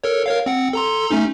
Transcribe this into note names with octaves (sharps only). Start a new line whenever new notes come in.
A4 A#4 C#5
A#4 C#5 F5
C4 F#5
A4 A#5 C6
A3 C#4 D#4